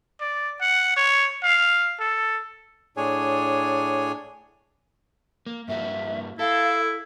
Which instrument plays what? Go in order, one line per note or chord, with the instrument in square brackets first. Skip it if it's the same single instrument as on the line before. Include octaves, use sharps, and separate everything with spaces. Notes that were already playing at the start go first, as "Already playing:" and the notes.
[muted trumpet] D5
F#5
C#5
F5
A4
[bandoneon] A2 D4 G#4 C#5 G#5
[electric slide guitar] A#3
[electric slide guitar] G2 A#3 F#4 [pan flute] E5
[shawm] E4 [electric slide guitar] A4 [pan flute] F5